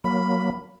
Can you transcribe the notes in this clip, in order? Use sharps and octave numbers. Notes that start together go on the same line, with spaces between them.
F#3 A#3 B5